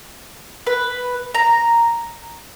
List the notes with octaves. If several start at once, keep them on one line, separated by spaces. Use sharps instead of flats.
B4
A#5